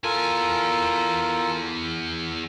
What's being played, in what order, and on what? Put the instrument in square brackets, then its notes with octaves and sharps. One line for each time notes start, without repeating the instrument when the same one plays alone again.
[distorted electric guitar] E2 G#5 [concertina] F4 A4 A#4